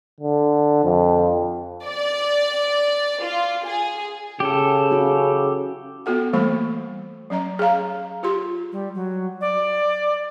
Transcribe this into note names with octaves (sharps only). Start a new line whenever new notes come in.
D3
F2
D5
F4
G#4
C#3 G4 A4
C#4 E4 F#4
B3 F#4 A4 F#5
E3 G3 A3 A#3 A4 B5
F#3 C#4 D#5 A#5
G#4 C#5 F5 A#5
F4 G4 C6
G3
F#3
D5